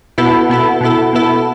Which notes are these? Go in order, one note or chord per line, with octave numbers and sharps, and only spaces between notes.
B2 B3 E4 A4
B2 B3 E4 A4
B2 B3 E4 A4
B2 B3 E4 A4